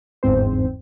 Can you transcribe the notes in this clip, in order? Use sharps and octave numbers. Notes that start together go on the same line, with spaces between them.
G1 E2 G#2 C4 C5